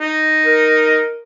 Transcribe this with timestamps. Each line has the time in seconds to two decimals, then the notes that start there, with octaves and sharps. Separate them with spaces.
0.01 D#4
0.45 A#4